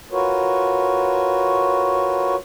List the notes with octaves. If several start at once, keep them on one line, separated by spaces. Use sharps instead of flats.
F4 F#4 A#4 B4 C#5